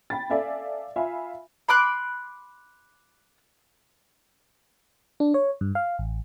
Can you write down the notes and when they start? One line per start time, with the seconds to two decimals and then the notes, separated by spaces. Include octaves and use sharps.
0.10 G5 B5 A6
0.30 A4 D5 E5 F5 G#5
0.96 F4 E5 F5 G#5 B5
1.69 B5 C6 D6 F#6
5.20 D4
5.34 C#5
5.61 G2
5.75 F5
5.99 A1